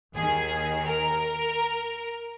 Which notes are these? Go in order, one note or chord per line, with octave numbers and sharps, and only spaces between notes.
D#2 D#3 G#4
A#4